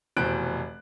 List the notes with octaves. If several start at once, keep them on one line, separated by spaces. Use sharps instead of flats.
F1 B2 E3 C5 F#6 D7